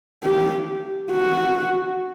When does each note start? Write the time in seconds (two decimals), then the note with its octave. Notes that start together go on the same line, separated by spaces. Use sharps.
0.24 G4
1.12 F#4